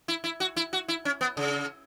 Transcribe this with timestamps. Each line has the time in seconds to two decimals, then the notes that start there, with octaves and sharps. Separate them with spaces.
0.08 E4
0.24 E4
0.40 F#4
0.56 E4
0.73 F#4
0.88 E4
1.05 C#4
1.21 B3
1.37 C#3